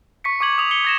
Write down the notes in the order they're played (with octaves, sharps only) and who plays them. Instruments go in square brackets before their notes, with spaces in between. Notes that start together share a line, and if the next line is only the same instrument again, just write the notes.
[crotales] C#6 B6 C#7
C#6 D6 G#6 F#7
D#6 F7 F#7
C#7 G7
G#6 A#6 E7